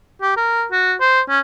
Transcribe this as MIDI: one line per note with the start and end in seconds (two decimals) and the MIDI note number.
0.22 0.34 67
0.37 0.65 70
0.71 0.95 66
1.00 1.21 72
1.29 1.40 61